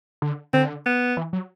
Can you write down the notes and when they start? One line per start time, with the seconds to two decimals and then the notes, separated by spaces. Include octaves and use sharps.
0.22 D3
0.53 D3 C4
0.86 B3
1.17 E3
1.33 F#3